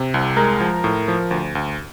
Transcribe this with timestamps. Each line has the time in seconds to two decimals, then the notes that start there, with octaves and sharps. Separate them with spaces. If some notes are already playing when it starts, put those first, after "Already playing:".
Already playing: C3
0.14 C2
0.36 G#3 A#4 A#5
0.61 F3
0.84 A2
1.08 F3
1.31 D2
1.55 D2